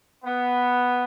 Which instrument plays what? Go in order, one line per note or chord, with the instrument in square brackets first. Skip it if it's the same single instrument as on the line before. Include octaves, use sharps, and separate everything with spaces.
[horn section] B3